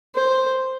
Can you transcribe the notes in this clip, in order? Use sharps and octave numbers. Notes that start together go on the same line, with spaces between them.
C5